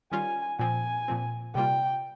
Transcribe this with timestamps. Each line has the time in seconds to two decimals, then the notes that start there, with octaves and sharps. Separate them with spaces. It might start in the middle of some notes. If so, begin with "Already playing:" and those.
0.12 D#3 G3 C#4 F4 G#5
0.59 A#2 F3 C4 G#5
1.08 A#2 F3 C4
1.55 C3 G3 A#3 F4 G5